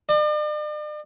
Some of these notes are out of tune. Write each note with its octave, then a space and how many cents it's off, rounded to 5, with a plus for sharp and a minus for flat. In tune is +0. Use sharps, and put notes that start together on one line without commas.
D5 +45